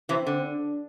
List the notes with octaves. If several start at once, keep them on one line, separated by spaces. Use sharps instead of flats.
C3 E3 C4
D3
D4